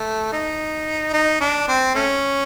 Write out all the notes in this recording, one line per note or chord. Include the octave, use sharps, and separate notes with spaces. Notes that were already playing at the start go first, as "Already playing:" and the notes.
Already playing: A3
D#4
D#4
D4
C4
A3 C#4